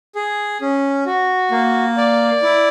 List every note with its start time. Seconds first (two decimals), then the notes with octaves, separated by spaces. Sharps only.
0.15 G#4
0.61 C#4
1.06 F#4
1.51 A#3
1.97 D5
2.43 E4